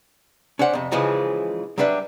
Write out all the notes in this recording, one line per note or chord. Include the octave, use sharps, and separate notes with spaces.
C#4 D4 C5 F#5
F2 C3
C#3 E3 F3 G#3 D#4
F#3 G3 D4 B4 E5